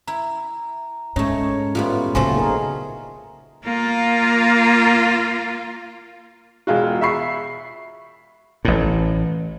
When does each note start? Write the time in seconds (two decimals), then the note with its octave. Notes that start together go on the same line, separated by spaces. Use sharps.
0.08 E4 A#5
1.16 G#2 A3 C#4 D#4 C#5
1.75 A2 G3 B3 F4
2.15 A#2 C#3 F3 F#3 A3 G#5 C6
2.36 D#4 G#4 A#4
3.64 A#3 F4
6.67 E1 G#3 F4 F#4
7.01 E5 B5 C#6 C7
8.65 A1 A2